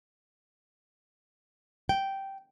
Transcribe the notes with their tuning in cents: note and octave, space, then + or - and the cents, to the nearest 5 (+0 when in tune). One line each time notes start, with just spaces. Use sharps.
G5 -10